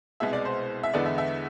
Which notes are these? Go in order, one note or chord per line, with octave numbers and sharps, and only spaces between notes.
C2 B2 G#3 E5
D5
C5
E5
E2 D3 G#3 B3 D5
E5
E5